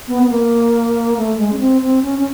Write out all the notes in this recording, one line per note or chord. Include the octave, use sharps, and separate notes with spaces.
B3
B3
A#3
A3
G#3
C#4
C4
C4
C#4
C#4